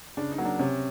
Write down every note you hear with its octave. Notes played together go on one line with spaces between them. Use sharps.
C#3 D4
D#4
F#3 A#3
D4
C3 C#4